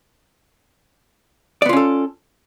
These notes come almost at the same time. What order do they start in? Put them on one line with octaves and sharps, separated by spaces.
D5 B3 F4 C#4 A4